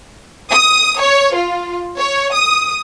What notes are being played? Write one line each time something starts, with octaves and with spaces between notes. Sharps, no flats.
D#6
C#5
F4
C#5
D#6